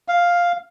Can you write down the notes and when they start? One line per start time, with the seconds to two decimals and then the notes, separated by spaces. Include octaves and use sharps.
0.08 F5